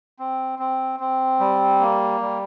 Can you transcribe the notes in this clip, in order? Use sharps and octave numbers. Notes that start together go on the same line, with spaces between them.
C4
C4
C4
G3
A#3
G3